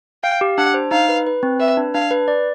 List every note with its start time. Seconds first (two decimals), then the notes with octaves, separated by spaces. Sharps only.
0.24 F5 G5
0.41 G4
0.58 D4 F#5
0.74 C5
0.91 D#4 F5
1.09 B4
1.27 B4
1.43 C4
1.59 B4 E5
1.77 D4
1.94 D4 F5
2.11 B4
2.28 D5